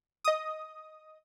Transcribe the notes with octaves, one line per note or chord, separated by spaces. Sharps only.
D#5 D#6